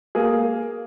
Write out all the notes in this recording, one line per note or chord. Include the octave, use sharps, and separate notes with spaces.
A#3 G#4